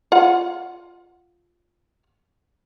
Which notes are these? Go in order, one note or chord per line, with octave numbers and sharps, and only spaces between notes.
F4 F#5